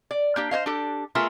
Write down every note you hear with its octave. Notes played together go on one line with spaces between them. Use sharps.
D5
A#3 D4 G4
C5 C#5 D#5 F5
D4 G4 A4
A3 B3 F4 G#4 A#4 E5